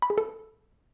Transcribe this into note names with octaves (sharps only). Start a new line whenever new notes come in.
B5
G#4
A4